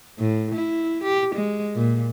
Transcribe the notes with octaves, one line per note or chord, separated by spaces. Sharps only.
A2
E4
G4
G#3
A#2